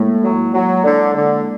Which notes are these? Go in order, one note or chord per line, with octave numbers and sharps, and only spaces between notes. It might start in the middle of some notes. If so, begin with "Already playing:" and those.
Already playing: A2 G#3 A#3 E4
F#3
F#3
D3
D3